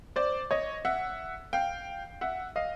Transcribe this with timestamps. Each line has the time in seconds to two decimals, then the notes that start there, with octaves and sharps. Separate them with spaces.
0.16 C5 D5
0.51 C#5 D#5
0.85 E5 F#5
1.53 F5 G5
2.21 E5 F#5
2.56 D#5 F5